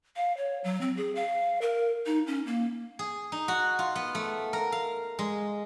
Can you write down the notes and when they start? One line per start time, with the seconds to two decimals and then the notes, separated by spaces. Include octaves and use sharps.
0.16 F5
0.37 C#5
0.64 F#3
0.81 C4
0.97 G#4
1.16 F5
1.62 A#4
2.06 D#4
2.27 C#4
2.46 A#3
2.99 G#4
3.32 D#4
3.48 F#4
3.79 F4
3.95 B3
4.15 A3
4.53 A#4
4.72 F5
5.19 G#3